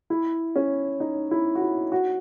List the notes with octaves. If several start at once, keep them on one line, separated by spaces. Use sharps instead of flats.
E4
C#4
D#4
E4
F#4
E4
F#4